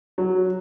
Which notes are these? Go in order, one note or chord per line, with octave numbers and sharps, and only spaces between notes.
F#3